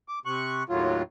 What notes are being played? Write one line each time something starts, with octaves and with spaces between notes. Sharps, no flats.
D6
C3 C#6 F#6
D#2 A2 F#3 F4